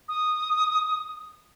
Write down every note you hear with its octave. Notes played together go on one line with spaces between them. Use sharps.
D#6